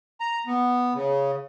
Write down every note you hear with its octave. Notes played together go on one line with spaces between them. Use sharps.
A#5
B3
C#3